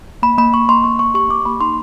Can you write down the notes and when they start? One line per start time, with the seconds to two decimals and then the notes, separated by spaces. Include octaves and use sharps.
0.22 A#3 B5
0.38 A#3 B5
0.54 A#3 C#6
0.68 A#3 C6
0.84 A#3 C#6
0.99 A#3 C#6
1.14 G4 C#6
1.29 A#3 D6
1.45 A#3 B5
1.61 D#4 C6